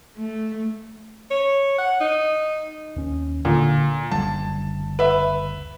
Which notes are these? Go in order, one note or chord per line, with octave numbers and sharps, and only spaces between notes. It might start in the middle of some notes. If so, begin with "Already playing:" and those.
A3
C#5
F#5
D#4
D#2 C#4
D1 A#2 D3
F#1 D2 G3 A5
B4 E5